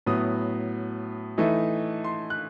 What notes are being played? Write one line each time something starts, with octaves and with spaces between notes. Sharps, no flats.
A2 F#3 B3 D#6
E3 A3 D#4
C6
F#6